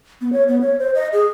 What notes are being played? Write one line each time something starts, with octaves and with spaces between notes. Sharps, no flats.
B3
C#5
B3
C#5
C5
D#5
G#4